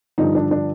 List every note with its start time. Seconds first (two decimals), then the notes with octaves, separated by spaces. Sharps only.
0.18 G2 D3 F3 D#4
0.35 D4
0.51 D4